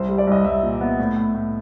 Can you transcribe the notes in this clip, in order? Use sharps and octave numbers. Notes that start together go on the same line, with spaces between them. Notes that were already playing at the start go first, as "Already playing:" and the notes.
Already playing: C2 C5
G3
D5
C2 D#5
C2 E5
A#2
B3
A2
A2
A2